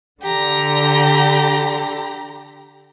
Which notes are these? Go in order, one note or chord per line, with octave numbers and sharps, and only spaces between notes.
D3 G4 A#5